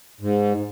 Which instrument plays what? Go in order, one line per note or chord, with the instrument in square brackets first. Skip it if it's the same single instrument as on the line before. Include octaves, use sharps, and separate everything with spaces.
[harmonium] G#2